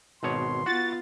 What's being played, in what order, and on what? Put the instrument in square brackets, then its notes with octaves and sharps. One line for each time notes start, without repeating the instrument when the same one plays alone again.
[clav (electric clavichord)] G#1 B2 C#5 [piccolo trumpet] C6
[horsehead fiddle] B3 F4 [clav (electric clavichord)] F#4 [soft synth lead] A6